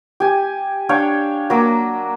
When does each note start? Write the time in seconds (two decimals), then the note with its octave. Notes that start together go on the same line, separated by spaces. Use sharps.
0.20 G4 G#5
0.89 D4 C#5 F5 G5
1.50 F#3 A#3 D6